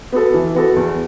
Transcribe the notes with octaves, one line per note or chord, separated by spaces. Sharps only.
B3 F#4 A4
E3
B3 F#4 A4
E2